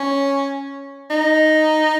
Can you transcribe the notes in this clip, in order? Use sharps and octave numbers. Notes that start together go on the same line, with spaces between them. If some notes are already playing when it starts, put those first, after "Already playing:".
Already playing: C#4
D#4